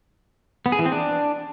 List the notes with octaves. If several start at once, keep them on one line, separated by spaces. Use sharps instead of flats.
B3
G#4
E3
C4
D4